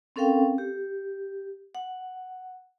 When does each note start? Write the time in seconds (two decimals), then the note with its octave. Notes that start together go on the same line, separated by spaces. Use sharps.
0.16 C4 C#4 A4 A#4 F5 G5
0.58 G4
1.75 F#5